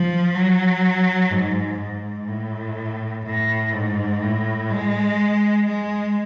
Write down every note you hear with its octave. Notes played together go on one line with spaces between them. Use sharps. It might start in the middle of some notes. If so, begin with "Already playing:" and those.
Already playing: F3
F#3
G#2
G#2
A2
A2
G#2
A2
G#3
G#3